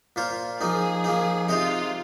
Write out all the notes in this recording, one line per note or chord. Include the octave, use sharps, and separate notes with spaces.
A#2 A#3 F4 C5
F3 A#3 D#4 G#4
F3 A#3 D#4
C3 G#3 D#4 F4 C5 D#5